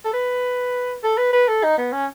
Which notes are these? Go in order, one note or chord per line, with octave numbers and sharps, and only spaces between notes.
A4
B4
A4
B4
B4
A4
D#4
B3
C#4